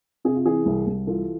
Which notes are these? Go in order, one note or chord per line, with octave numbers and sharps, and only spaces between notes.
C3 G#4
F4
E3 G#4
C2
C2
E3 F4 A4